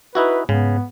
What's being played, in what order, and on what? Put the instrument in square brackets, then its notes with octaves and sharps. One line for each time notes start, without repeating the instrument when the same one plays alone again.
[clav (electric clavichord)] D#4 E4 F#4 [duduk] B4
[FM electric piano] G#2 [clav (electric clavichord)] C#3 [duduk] B3